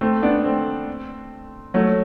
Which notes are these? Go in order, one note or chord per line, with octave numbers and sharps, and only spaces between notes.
A3 C4
B3 D4
A3 C4
F#3 A3